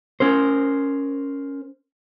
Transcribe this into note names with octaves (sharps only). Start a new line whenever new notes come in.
C#4 A#4 C5